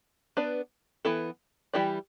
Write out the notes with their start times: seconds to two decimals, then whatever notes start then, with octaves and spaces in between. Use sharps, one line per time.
0.37 B3 D4 B4 D5
1.05 E3 B3 E4 A4
1.74 E3 G3 E4 G4 D5